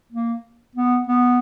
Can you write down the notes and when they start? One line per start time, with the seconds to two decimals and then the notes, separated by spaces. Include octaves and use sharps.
0.12 A#3
0.76 B3
1.07 B3